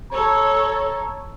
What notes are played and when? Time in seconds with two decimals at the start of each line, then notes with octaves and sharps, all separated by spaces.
0.12 A4 C#5 A#5